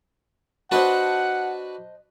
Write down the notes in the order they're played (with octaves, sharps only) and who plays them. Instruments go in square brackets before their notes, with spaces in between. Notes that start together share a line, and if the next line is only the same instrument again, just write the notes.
[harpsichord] D4 F#4 B4 [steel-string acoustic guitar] C5 D#5 A5 [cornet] F#5